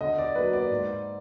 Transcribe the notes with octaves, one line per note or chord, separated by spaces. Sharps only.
D3 D#5
D5
F#3 A#3 B4
D5
G#2